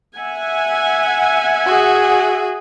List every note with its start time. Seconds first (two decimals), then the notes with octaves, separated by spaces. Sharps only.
0.18 E5 F#5 G#5
1.66 F#4 G#4